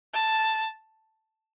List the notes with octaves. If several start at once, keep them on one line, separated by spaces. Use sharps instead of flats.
A5